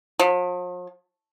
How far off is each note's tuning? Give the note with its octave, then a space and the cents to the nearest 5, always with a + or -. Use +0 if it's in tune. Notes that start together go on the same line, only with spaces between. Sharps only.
F3 +45